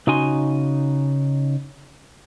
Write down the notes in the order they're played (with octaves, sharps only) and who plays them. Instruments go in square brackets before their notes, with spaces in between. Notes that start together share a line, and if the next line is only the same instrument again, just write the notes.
[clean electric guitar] C#3 D#4 F#4 G#5 C6